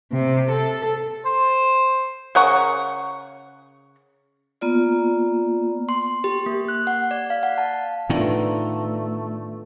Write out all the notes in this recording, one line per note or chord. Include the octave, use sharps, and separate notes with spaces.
C3
A4
C5
C#3 A#4 F#5 C#6
A#3 B3 F4 D5
C6
G4
A#3
F#6
F#5
D5
F5
F#5
A5
A2 D#3 A3 B3 D4 F4